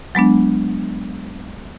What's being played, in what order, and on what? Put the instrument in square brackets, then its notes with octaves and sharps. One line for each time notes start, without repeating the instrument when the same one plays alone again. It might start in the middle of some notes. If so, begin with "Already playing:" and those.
[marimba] F#3 G#3 B3 D4